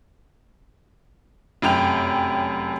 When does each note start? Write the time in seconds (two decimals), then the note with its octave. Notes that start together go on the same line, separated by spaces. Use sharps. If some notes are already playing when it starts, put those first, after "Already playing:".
1.62 F1 F#2 G5 F7